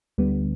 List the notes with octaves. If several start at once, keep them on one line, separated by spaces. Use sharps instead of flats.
D2 D3 G3 B3